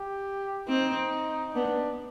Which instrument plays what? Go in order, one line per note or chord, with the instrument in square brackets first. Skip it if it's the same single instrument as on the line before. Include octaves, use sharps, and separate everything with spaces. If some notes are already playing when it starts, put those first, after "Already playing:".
Already playing: [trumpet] G4
[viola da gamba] C4 [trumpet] D#4
[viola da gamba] B3 [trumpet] D4